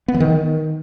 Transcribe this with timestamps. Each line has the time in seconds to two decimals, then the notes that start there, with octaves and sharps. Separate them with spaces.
0.08 B3
0.14 E3
0.20 D#3